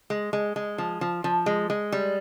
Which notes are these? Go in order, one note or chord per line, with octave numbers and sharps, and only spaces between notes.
G#3
G#3
G#3
F3
F3
F3
G#3
G#3
G3